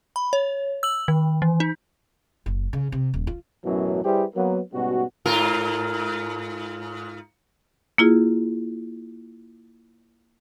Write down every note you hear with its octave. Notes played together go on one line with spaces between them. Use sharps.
B5
C#5
E6 F#7
D#3
E3
D#4
F#1
C#3
C3
D#1
F4
A1 F#2 B2 E3 F#3
G3 E4 G4 G#4 B4 C5
F#3 A#3 B3
G#2 B2 G3 C#4 F#4
G#2 F4 A#4
A#3 E4 F4 G#4